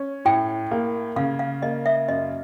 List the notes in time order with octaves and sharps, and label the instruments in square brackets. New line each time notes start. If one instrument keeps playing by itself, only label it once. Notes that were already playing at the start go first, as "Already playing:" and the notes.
Already playing: [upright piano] C#4
[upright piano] A2 [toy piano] G5
[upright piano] A#3
[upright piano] C#3 [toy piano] F5
[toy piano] F5
[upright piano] A#3 [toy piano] D#5
[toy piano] E5
[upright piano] F#2 [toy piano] D#5